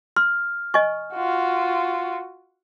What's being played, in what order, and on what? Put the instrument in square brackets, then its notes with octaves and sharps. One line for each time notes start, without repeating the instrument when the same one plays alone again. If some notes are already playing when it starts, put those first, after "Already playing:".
[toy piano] C6 [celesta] F6
[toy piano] D#5 G#5 C#6
[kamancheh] F4 F#4